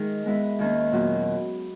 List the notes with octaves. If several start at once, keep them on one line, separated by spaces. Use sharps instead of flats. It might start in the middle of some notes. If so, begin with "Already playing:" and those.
Already playing: D#3 G#3 D#4 G#4
G#3 B3 E4 B4
D#2 D#3 A#3 C#4
A#2 F#3 B3